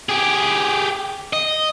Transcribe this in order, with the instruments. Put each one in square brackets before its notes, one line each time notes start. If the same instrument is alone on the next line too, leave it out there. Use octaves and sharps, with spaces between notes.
[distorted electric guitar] G4 G#4
D#5